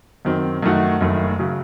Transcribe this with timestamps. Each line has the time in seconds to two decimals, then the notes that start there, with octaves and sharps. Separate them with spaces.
0.25 F#2 D#3 F#3 C4
0.63 F#2 D#3 A3 D#4 F#4
1.01 F#1 F#2 D#3 A3
1.39 C#3 F#3